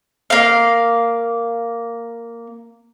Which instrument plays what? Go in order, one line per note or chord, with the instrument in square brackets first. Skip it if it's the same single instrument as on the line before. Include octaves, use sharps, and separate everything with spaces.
[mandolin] A#3 F5